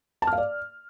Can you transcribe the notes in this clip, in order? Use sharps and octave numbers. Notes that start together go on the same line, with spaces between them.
A5
F6
F5
D5